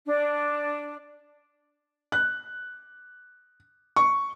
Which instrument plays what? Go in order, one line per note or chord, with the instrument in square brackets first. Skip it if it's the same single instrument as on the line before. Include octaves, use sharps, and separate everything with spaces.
[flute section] D4
[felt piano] F#6
C#6